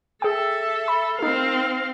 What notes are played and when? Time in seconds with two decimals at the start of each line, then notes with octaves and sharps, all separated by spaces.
0.22 G#4 A4 E5 G5
0.88 B5
1.19 C4 D#4 A#4 F5